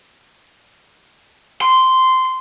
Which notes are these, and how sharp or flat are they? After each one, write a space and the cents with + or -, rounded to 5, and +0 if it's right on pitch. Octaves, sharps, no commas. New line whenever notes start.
C6 -10